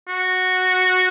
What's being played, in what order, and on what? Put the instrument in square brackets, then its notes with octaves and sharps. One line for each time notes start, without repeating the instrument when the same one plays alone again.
[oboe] F#4